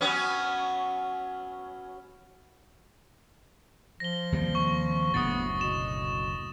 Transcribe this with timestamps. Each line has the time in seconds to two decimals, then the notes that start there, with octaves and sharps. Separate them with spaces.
0.01 F#3 B3 C#4
4.00 F3 A#6 G7
4.32 D#2 C3 G3
4.55 C#6
5.14 F#1 D2 A2 B3 D#6 A6
5.61 B2 E7